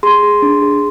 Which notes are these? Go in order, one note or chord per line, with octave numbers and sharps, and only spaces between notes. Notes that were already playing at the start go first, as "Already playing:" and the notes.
G#4 C6
G#4
D4
G#4